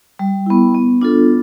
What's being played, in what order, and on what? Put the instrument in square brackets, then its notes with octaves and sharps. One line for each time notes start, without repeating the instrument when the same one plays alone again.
[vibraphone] G3
B3 E4
B3
D4 F4 A4